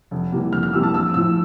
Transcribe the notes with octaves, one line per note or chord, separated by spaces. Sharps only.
F1
F2 E3 G3 A#3
F1 F6
F6
F2 E3 G3 A#3 E6
A5
A#1 E6
A2 F3 E6